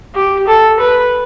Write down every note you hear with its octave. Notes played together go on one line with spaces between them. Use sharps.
G4
A4
B4